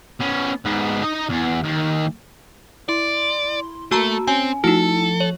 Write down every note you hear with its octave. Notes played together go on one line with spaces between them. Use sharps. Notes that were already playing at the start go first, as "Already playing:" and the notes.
B3 C#4
G#2 B3
D#4 D#5
E2
D#2
E4 D5 C6
A3 A#3 F#4 A5 A#5 E6
C4 C#4 G#5
F3 A3 D#4 E4 F#4 A4
C#5